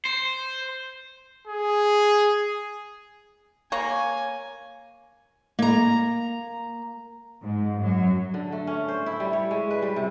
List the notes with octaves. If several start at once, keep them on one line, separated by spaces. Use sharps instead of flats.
C5
G#4
A#3 C#5 G#5 A#5
A#3 A#5
G#2
F#2 F#3
D3
A3
C#4
C5
E4
G3
C#5
G#3
B4
G3
C3